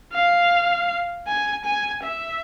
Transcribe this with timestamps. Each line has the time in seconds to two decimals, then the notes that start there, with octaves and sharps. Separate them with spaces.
0.13 F5
1.27 G#5
1.65 G#5
2.04 E5